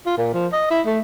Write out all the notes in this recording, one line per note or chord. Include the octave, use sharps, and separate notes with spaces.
F4
A#2
F3
D#5
E4
A3